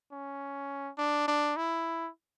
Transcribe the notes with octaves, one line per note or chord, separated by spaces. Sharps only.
C#4
D4
D4
E4